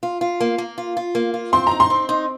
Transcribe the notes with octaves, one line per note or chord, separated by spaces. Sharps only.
F4
F4
A#3
A#3
F4
F4
A#3
F4
C4 C6
D#4 A#5
C6
C4
D#4